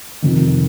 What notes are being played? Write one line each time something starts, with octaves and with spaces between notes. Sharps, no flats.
F2 C3 D#3